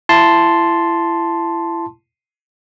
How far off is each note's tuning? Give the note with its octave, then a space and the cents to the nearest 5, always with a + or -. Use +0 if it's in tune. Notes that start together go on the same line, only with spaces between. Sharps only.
E4 +30 A5 +0 C6 +0